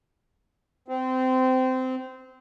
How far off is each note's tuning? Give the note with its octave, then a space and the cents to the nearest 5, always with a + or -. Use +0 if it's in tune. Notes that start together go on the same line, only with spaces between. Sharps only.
C4 -20